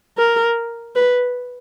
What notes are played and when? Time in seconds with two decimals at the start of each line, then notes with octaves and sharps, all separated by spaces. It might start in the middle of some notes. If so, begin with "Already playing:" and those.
0.18 A#4
0.95 B4